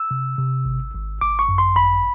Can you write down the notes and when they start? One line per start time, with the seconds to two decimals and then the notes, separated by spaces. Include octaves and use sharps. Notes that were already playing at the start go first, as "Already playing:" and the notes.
Already playing: E6
0.11 C3
0.38 C3
0.65 G#1
0.94 G#1
1.21 G#1 D6
1.39 C#6
1.49 F#2
1.58 C6
1.76 G#1 B5